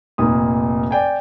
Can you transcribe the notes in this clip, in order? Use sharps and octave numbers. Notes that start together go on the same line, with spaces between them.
F1 A#2 D#6
D5 G5 G#5